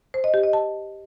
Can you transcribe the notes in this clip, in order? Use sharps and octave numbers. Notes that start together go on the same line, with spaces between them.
C5
D#5
G4
D#5
A5